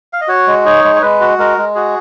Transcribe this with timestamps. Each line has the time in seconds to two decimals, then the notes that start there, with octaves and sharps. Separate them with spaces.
0.13 F5
0.21 D#5
0.28 F#4 C#5
0.48 G#3
0.65 D#4 C#5
0.84 G#3
0.95 C#5
1.02 G#3 B4
1.21 F#4
1.38 G#3 A#4
1.58 G#3
1.75 F#4 G#4